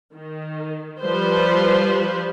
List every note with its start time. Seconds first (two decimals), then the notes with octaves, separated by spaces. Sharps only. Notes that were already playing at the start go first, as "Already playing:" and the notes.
0.15 D#3
1.02 F3 G3 B4 C5